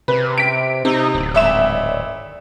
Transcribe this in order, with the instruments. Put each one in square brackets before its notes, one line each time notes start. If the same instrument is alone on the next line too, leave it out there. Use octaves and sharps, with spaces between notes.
[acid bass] C3 [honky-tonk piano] B4
[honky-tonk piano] B6 D7
[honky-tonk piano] C3 [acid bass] D#4
[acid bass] D1
[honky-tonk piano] G#1 E5 E7